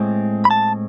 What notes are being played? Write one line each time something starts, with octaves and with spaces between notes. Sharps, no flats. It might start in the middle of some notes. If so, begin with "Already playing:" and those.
Already playing: A2 G#3 C4
B5
A5